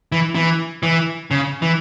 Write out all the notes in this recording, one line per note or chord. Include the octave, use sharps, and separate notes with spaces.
E3
E3
E3
C#3
E3